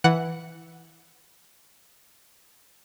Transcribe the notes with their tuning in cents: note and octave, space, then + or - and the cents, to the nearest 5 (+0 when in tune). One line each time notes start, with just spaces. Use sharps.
E3 +0 F#5 +0